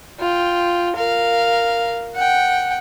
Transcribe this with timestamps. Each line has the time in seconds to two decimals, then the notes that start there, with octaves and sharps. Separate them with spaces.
0.20 F4 G5
0.96 A#4 F5
2.16 F#5 G5